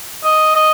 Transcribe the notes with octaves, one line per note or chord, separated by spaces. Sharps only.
D#5
D#5